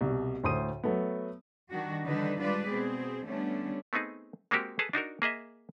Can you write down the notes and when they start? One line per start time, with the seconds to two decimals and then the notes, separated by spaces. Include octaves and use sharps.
0.01 C2 B2
0.43 D2 A2 C5 C6 D#6 D#7
0.84 F#3 A3 B3
1.70 D#3 G3 D4 F#4
2.06 D3 E3 G3 D4 D#4 B4
2.39 G3 G#3 D4 F4 B4 D5
2.69 B2 C4 G#4
3.26 D3 G3 A3 B3 C#4 D4
3.93 A3 B3 C4 D#4 G#4
4.51 G#3 A#3 C4 F#4 G4 A#4
4.79 G#4 A4 B4 A5
4.93 D4 D#4 F#4 A#4
5.22 A#3 G#4 D#5 E5